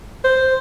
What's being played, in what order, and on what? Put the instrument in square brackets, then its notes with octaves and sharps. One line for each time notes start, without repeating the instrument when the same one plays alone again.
[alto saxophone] C5